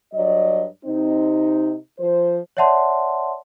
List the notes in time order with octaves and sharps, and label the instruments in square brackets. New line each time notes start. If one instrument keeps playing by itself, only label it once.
[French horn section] G2 F#3 D5 D#5
C3 C4 D#4
F3 C5
[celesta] C#5 D5 E5 F#5 A5 C6